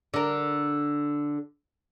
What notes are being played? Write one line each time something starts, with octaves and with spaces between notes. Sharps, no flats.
D3 A#4